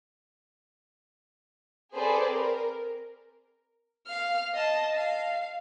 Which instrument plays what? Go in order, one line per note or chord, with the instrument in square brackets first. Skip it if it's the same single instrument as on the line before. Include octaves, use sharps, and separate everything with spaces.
[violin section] C4 G#4 A4 B4 C5 D5
A#4
[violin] F5 F6
D#5 A5
F5